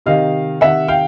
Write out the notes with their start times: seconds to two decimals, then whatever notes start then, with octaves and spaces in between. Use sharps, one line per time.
0.06 C3 D#3 D#5 F5
0.61 C3 D#3 E5 F#5
0.88 F5 G5